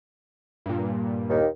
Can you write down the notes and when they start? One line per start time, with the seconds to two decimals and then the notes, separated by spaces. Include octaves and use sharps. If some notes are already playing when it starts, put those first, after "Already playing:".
0.66 G2 A#2
1.30 D#2 D#3